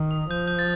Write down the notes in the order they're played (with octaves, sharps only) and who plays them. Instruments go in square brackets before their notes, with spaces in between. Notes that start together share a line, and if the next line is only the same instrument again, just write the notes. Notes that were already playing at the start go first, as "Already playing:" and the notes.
Already playing: [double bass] D#3
[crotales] D#6
[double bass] F3 [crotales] G6
[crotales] G6
A6